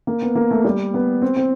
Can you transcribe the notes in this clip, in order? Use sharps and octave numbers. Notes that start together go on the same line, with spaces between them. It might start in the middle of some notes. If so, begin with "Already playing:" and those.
A#3
B3
A#3
A3
G3
B3
C4
C4